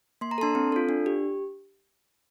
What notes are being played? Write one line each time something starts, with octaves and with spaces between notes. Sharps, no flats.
A#3 C6
A#5
D4 A4 A5 C6
C4
F4 A4
D4
G4